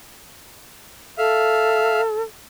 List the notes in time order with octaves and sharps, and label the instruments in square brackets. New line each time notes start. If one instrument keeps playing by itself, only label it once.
[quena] A4 [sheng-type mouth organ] E5 F5